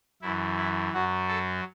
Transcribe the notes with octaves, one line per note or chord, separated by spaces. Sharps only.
F#2 E3 E4
E4
F#2 F#3 F#4
A4